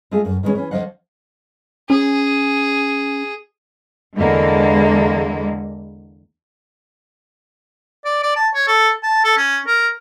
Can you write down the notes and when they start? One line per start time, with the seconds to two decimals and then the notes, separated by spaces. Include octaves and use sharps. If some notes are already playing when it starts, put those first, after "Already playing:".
0.11 G#3 A3 F4 G#4
0.25 F#2
0.43 D#3 E3 G#3 A#3 C#4
0.55 E3 C#4
0.71 D2 B2 F3 D#5 F5 F#5
1.90 C#4 G#4
4.17 E2 D3 G#3 A#3
8.05 D5
8.23 D5
8.36 A5
8.54 C#5
8.67 A4
9.03 A5
9.24 A4
9.37 C#4
9.67 A#4